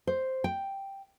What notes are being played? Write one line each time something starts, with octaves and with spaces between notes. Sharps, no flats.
C5
G5